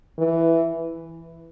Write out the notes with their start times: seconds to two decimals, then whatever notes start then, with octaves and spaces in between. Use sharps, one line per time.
0.19 E3